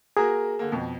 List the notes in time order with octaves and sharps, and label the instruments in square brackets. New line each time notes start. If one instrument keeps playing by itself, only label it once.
[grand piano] A#3 F#4 A#4 [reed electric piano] G#4
[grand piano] D3 A#3
F2 B2